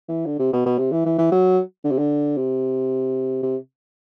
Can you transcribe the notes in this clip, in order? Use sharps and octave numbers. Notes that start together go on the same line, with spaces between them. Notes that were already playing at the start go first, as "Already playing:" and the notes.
E3
D3
C3
B2
B2
C3
E3
E3
E3
F#3
D3
C3
D3
C3
C3